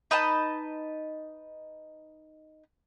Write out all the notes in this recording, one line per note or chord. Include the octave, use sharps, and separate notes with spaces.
D#4 B4 D#5 A5